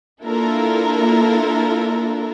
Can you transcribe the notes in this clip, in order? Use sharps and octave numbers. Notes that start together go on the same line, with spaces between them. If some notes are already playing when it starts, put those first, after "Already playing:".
A#3 D4 E4 F4 A4 A#4